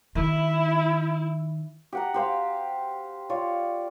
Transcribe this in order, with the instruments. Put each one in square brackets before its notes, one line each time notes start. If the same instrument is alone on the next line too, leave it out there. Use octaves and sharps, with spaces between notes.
[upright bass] D#3 [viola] E4
[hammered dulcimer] G4 F#5 A#5
G4 C5 F5
F4 C#5 D5